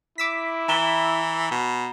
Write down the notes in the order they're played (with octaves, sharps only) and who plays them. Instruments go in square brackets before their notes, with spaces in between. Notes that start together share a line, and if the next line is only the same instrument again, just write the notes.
[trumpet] E4 [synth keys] D6 E6 B6
[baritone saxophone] E3 [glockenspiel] A#5 E7 G7
[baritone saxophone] B2